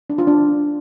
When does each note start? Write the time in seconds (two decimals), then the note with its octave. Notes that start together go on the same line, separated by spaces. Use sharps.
0.10 D4
0.18 F4
0.27 D4